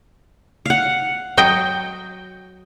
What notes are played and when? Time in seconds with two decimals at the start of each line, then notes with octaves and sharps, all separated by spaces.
0.66 F5 F#5
1.37 F#3 D#5 G5